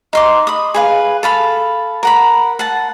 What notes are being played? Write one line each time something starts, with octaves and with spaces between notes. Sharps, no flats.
D#4 C6 D6
B5 D#6
G#4 B4 F5
A4 F5 B5
A#4 F#5 B5
F#5 A5